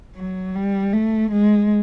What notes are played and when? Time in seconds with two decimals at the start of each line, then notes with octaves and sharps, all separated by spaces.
0.16 F#3
0.56 G3
0.94 A3
1.32 G#3